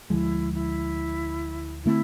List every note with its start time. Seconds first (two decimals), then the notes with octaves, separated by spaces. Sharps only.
0.10 D2 D3 F3 G#3 E4
0.54 E4
1.84 D3 A3 C4 E4